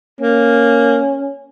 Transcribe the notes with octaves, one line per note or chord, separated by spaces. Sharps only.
A#3 C#4